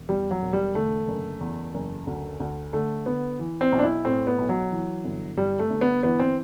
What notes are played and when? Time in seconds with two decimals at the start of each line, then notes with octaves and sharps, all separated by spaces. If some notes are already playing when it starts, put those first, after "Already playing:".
Already playing: E1
0.09 E2 G3
0.31 F#3
0.42 E1
0.53 G3
0.75 D3 A3
1.08 F#1
1.41 E2
1.74 F#1
2.07 D2
2.40 D2
2.73 D3 A3
3.06 D3 B3
3.39 E3
3.61 C4
3.72 B1
3.79 D4
3.83 E4
4.05 A2 C4
4.27 B3
4.38 B1
4.49 F#3
4.71 E3
5.04 G1
5.37 G2 G3
5.59 A3
5.70 G1
5.81 B3
6.03 E3 B3
6.20 C4